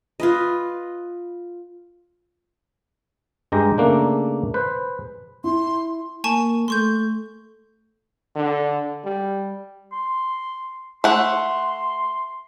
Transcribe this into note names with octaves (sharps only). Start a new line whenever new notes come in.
F4 B4 D#5
G2 G#3 G4 A#5
C#3 A3 A#3 D4
B4 C5
E4 C6
A#3 G#5 A5 C#6
A3 C6 C#6 G6
D3
G3
C6
A3 F#5 C6